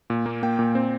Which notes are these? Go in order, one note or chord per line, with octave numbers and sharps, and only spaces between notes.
A#2
A#3
A#3 G5
A#2
C4